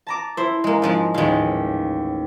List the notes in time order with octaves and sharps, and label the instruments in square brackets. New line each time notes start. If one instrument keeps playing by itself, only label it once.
[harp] A5 A#5 D6
[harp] E4 C5 [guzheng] E5
[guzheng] G#3 A#3
G#2 F3 G#3
[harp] A1 D#2 [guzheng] G#3 F5